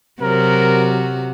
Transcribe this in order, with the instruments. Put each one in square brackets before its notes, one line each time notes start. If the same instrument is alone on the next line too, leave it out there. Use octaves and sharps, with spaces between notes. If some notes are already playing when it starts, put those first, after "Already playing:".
[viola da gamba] C3 F#4 [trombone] F#3 [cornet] A#4